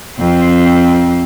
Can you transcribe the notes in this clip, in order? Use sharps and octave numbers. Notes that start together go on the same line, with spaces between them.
F2 C4